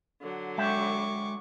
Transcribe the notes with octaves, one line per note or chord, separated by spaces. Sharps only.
D3 F#3
G#3 E5 G5 C#6 D6